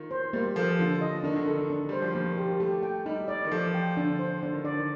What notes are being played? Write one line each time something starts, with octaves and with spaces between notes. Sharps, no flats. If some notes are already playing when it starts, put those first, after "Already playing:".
Already playing: D#3 F4
C5
G3 A#3
F3 A4
D3 F4
D#5
D#3 D4
D3
D#3 A4
D4
G3 C5
F3
D#3 A#3
G4
A3 G4
G5
G3 D#4
D5
D#3
F3 A4
G5
D3 D4
C5
D3 D4
D#3
D3 D5
D#3